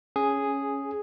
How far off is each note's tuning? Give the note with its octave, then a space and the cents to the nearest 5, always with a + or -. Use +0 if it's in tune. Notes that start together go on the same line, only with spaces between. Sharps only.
C#4 +0 G#4 +0